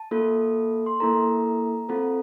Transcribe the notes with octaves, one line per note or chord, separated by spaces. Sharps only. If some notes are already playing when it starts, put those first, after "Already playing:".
Already playing: A5
A#3 F4 A4
C6
A#3 E4 A4 A#5
C4 F4 A4